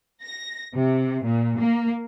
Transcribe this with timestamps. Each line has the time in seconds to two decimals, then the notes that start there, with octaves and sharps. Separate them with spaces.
0.23 A#6
0.74 C3
1.25 A#2
1.58 A#3